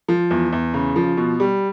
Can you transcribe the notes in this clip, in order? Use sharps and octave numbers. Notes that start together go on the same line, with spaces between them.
F3
E2
E2
C#3
F3
B2
G3